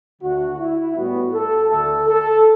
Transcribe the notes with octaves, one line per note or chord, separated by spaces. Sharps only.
D2 D3 A3 F#4
E4
A2 G3 B3 F#4
A4
D2 D3 A3 A4
A4